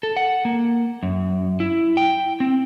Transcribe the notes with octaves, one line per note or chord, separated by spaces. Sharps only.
A4
F#5
A#3
F#2
E4
G5
C4